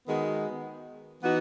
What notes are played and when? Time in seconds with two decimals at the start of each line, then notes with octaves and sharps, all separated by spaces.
0.07 D#3 G#3 B3 F#4
1.22 E3 B3 D#4 F#4